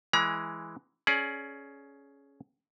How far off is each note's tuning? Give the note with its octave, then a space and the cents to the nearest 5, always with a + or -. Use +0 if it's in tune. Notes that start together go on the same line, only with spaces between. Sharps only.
E3 +0 G#3 +0 A#5 +40
C#4 +0 G#4 +25 D5 +0